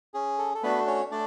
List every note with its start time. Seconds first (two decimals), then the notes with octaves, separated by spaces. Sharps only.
0.14 C#4 G#4
0.39 A4
0.54 A4
0.63 A3 B3 D4 F#4 B4
0.87 C#4 C#5
1.11 A3 D4 D5